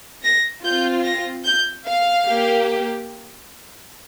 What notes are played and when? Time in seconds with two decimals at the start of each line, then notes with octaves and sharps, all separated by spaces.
0.24 A#6
0.64 C4 F4 G6
1.05 A#6
1.45 G6
1.87 F5
2.29 A#3 G4